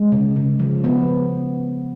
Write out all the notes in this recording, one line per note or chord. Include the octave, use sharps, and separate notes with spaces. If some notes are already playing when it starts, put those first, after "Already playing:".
Already playing: G#3
C#3
C#3
F3
B3